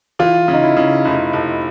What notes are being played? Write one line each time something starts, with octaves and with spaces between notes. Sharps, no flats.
E3 F4
C#3
D#4
E4
C#3
F1 E4
F1